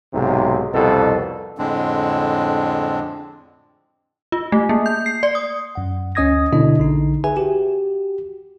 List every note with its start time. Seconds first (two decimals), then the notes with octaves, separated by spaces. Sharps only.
0.13 B1 G#2 C3
0.73 C2 F2 B2 A4
1.58 F2 A2 D3 G#3 C4 D4
4.32 F4
4.52 A3
4.69 A#3
4.86 G6
5.06 C7
5.23 D5
5.35 D#6
5.75 F#2 F#5
6.15 D2 C#4 D#5 D#6 G#6 A#6
6.53 B2 D3 A#3 D4 E4 D#5
6.79 A#1 D3 D#4
7.24 G#4 B4 E5 G#5
7.37 F#4 G4